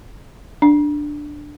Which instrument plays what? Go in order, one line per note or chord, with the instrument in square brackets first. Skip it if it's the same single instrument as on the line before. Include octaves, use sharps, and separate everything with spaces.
[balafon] D4